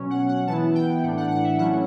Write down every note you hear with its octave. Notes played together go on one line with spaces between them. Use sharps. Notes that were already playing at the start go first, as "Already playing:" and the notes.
Already playing: B2 F#3 C#4
F#5
F#5
E3 B3 E4 A5
G5
A2 E3 A3 D4 F#5
F#5
F#5
E5
F#3 A3 C#4 E4 F#5